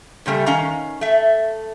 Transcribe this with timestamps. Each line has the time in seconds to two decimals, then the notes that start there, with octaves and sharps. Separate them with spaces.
0.26 A#2 C#3 G3 A3
0.46 D#3 C#4 F5 A#5
1.01 A3 E5